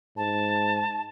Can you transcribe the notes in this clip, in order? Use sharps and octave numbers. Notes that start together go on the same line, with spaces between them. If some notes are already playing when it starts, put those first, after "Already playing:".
G#2 A5